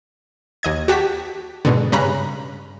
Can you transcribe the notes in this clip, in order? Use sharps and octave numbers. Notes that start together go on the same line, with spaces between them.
D#2 D#5 G#6
F#4 G4 A5 B6
G#2 B2 D3
G2 C#3 C#4 A#5 B5 F#6